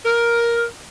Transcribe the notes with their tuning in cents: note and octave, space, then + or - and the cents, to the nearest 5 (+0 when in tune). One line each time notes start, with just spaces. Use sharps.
A#4 +10